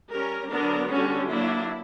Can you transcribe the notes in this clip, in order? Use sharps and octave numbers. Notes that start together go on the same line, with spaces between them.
G3 C#4 A#4
D3 F#3 B3 D4 A#4
D3 G3 C#4 F#4
F#3 A#3 D4 E4